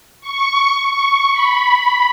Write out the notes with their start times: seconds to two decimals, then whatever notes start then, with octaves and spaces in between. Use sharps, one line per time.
0.21 C#6
0.92 C#6
1.33 B5